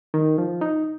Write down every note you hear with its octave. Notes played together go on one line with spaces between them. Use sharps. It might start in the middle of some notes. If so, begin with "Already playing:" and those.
D#3
F3
D#4